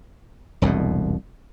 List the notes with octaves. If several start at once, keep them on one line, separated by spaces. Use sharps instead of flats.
E1 C2 F2 B2